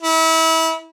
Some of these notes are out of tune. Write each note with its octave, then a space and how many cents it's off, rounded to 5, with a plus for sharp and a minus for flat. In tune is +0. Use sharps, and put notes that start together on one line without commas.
E4 -30